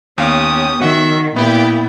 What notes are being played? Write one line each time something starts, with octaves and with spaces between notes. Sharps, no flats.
D#2 B3 C#4 G4 F5 D#6
D#3 F#4 E5 F#5
A#2 B3 E4 G4 G5